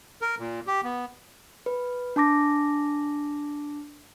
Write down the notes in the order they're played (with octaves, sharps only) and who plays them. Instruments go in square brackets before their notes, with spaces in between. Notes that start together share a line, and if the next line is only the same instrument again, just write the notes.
[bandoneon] A#4
A#2
G4
B3
[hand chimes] B4
D4 A5 D6 A#6